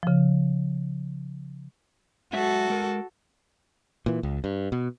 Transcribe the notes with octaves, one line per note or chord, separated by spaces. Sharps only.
C#3 F3
F#3 G#3 F#4 A4 E5
G#3 A#4
A#2 E3
C#2
G2
B2